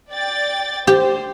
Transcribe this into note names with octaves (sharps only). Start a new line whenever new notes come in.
D5 G5 A6
G4 C5